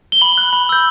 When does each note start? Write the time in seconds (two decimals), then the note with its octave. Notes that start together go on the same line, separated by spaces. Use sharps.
0.12 G7
0.21 B5 F#7
0.38 F#6
0.53 B5
0.69 E6 G6